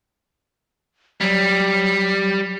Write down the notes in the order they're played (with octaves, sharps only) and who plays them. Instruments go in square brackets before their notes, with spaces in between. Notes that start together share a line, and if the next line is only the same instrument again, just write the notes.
[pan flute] F#3 [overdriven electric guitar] G3